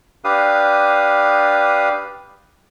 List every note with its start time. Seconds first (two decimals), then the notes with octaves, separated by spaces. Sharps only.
0.24 D4 G4 B4 F5 D#6